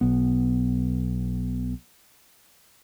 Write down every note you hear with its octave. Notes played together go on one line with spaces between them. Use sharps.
B1 B3